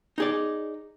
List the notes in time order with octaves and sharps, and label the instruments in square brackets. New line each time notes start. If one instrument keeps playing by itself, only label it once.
[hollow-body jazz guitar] D#4 G#4 D5